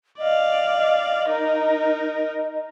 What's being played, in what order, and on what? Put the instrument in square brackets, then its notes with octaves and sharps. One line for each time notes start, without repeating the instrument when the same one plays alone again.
[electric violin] D5 F5 [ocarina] D#5
[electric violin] D#4 A#4